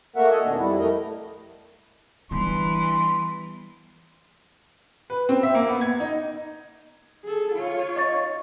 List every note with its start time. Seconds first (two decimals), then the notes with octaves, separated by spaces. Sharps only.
0.16 A3 A#3 F#4 A#4 E5 F#5
0.31 A4 D#5 E5 F#5 G#5
0.43 F2 B2 D#3 D4
0.59 F2 G3 E4
0.79 A3 A#4 D#5
2.31 E3 G3 B3 D4 B5 C6
5.10 B4
5.29 C4
5.43 E5
5.55 A#3
5.68 B3
5.81 G#6
6.00 D#4
7.24 G#4 A4
7.54 F4 C#5
7.96 D#5 C#6 A6